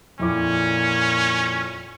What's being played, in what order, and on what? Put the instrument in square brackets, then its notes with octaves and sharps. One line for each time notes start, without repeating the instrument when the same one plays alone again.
[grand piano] F2 E4 D6 [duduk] A#2 [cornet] C#4